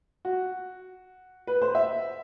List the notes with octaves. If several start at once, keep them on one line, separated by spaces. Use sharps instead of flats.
F#4
B4
C5
E5